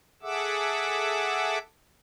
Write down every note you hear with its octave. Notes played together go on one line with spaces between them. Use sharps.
G#4 A4 E5 F#5 D6 E6